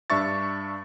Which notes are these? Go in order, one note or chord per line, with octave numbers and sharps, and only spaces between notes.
G2 D4 E5 C#6 A6